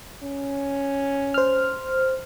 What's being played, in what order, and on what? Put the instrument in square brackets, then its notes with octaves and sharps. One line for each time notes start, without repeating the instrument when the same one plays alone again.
[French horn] C#4
[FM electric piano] C5 F6